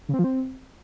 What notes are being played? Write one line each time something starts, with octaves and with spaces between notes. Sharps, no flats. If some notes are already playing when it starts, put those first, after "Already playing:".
C#3
C4
F3
C4